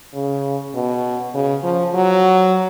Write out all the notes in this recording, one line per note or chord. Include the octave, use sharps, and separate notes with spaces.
C#3
B2
C#3
F3
F#3